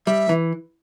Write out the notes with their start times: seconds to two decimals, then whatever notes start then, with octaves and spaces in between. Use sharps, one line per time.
0.07 G3 E5
0.29 E3